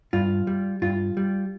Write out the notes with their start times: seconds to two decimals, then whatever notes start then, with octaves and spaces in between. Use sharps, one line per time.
0.13 G2 F4
0.47 G3
0.82 G2 F4
1.17 G3